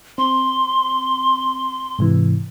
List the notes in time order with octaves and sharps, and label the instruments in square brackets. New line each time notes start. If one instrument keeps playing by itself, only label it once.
[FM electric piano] C4 [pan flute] C6
[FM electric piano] G#2 C3 E3